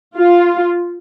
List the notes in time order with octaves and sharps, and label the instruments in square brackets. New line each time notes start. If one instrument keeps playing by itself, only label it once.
[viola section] F4